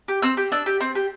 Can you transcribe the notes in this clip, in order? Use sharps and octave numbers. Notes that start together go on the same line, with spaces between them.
G4
C4 E6
G4
D4 E6
G4
C4
G4